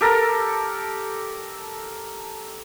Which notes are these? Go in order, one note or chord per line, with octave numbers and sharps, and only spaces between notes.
G4 A4 A#4